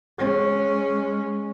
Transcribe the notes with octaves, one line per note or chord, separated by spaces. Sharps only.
G#3 C#4